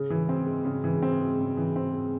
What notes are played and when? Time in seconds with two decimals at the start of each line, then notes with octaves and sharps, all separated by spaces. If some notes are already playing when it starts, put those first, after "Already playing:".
Already playing: C#3
0.10 E3
0.29 C4
0.46 G#3
0.65 C#3
0.84 E3
1.02 C4
1.21 G#3
1.39 C#3
1.57 E3
1.76 C4
1.93 G#3